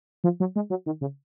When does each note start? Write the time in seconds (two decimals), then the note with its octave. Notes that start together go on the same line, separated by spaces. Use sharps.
0.24 F3
0.40 F#3
0.56 G#3
0.70 F#3
0.86 D#3
1.01 C#3